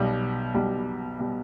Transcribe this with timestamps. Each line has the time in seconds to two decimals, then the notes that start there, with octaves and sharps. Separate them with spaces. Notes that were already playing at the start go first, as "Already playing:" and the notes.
Already playing: B1 B2 G3
0.54 B1 B2 G3
1.19 B2 G3